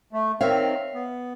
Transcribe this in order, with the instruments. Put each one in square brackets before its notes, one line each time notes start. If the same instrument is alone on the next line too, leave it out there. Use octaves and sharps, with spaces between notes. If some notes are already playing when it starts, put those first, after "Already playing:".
[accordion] A3
[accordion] D#3 C4 [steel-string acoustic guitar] C#5 E5 F5
[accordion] B3